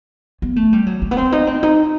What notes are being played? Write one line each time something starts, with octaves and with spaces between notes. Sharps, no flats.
B3
A3
G3
F#3
A3
B3
C4
D#4
C4
D#4